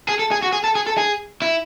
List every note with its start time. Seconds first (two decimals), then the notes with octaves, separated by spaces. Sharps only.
0.08 G#4
0.19 A4
0.31 G#4
0.43 F#4
0.53 G#4
0.64 A4
0.75 G#4
0.86 A4
0.97 G#4
1.42 E4